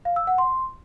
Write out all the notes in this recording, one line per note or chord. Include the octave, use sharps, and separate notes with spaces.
F5
E6
F#5
C6